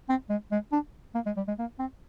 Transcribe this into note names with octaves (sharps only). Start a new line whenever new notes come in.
C4
G#3
G#3
D4
A#3
G#3
G3
G#3
A#3
C4